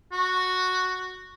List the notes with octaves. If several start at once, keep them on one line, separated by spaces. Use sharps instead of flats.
F#4